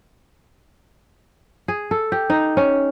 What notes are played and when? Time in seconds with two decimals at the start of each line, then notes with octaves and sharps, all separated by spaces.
1.68 G#4
1.91 A4
2.12 G4
2.30 D#4
2.57 C#4